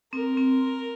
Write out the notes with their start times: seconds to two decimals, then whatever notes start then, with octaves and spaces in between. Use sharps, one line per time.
0.13 C4 A#4
0.37 C4